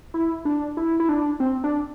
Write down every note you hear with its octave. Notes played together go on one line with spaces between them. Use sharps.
E4
D4
E4
E4
D4
C4
D4